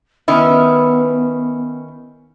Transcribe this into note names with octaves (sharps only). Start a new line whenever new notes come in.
D#3 B3 C#4 E4